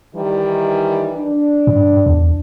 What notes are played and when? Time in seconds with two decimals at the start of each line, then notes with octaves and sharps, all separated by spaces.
0.15 D#3 E3 G3
1.15 D4
1.67 G2
2.06 E2